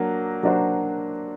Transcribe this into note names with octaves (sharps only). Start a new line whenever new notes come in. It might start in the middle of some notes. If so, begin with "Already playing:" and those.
Already playing: F#3 A#3 D4 F#4
F#3 A#3 D4 F#4 C5